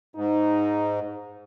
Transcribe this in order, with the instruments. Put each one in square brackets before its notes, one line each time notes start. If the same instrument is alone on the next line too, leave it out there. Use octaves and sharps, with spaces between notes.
[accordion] G#2 [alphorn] D#4